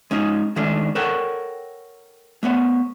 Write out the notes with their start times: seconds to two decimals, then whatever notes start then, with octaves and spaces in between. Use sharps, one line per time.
0.11 G#3 C#4 D#4 G#4
0.56 D#3 G#3 A3 C#4 D4
0.95 A4 A#4 C#5 F#5 G5
2.43 A3 B3 C#5